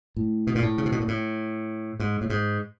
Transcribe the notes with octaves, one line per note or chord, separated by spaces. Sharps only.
A2
B2
A#2
A2
C#3
C3
B2
A#2
A2
G#2
A2
G#2